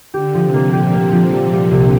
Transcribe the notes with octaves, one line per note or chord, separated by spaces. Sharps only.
D3 G4
F3
C3
A#3
A#2 G4
A#3
F3
G3
G3
C2